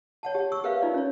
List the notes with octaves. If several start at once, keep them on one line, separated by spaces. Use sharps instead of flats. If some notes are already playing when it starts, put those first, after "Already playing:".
C#5 F#5 A5
G4 C#5
C#6 E6
G4 A#4 B4 E5 F5
D#4 F4 D5
C#4 C#5